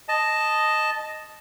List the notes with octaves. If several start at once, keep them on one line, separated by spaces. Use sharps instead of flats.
D#5 A5